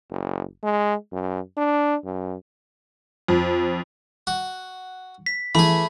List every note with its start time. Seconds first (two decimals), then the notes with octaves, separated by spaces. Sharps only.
0.10 F#1
0.63 G#3
1.12 F#2
1.57 D4
2.04 F#2
3.28 F2
4.27 F#4
5.26 B6
5.55 E3 A3 G#4 B5